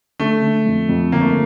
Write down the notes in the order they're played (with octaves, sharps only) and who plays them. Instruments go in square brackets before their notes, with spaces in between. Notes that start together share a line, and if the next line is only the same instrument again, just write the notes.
[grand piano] D3 [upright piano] A3
[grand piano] D3
F2
F2
[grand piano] G1 [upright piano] A#3
[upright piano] A3